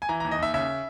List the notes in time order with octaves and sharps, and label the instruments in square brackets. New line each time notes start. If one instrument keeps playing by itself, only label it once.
[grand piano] G#5
E3 A#5
D#2 A#5
D#5
D#2 E5
C#3 E5